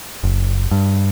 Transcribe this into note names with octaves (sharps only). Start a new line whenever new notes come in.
F#1
G2